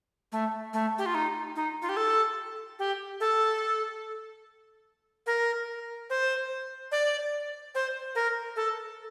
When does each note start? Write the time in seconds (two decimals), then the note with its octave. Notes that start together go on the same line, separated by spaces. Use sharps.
0.32 A3
0.73 A3
0.98 G4
1.06 F4
1.15 D#4
1.56 D#4
1.82 F4
1.89 G4
1.97 A4
2.79 G4
3.20 A4
5.27 A#4
6.10 C5
6.92 D5
7.75 C5
8.15 A#4
8.56 A4